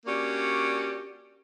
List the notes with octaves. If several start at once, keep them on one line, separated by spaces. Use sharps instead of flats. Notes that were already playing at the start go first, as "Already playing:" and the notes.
A#3 C#4 D4 F#4 G4 D5